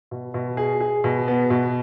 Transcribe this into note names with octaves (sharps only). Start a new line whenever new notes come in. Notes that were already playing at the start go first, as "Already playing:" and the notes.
B2
B2
G#4
G#4
B2
B3
B2